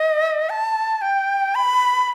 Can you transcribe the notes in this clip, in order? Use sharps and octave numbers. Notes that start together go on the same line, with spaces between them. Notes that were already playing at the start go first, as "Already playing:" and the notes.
Already playing: D#5
A5
G5
B5